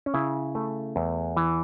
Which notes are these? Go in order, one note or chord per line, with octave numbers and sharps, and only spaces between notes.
C#4
C#3 E4
A3
E2
E3